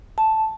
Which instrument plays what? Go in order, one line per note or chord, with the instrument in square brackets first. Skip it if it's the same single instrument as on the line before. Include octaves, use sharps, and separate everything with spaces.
[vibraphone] A5